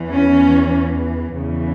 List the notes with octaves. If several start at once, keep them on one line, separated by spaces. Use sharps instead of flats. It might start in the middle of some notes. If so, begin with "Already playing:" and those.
Already playing: E2 E3
C#4
E2 C#3 E3